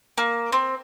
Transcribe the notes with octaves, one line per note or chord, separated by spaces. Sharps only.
A#3
C4